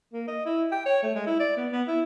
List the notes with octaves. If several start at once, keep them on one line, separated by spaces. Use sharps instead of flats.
A#3
D#5
E4
G5
C#5
A3
G#3
E4
D5
B3
B3
E4